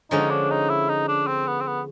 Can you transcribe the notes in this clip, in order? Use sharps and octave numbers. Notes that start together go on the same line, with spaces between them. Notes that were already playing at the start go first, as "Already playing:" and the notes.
D3 F3 G#3 C#4 D#4
D4
D#4
E4
D#4
D4
C4
B3
C4
B3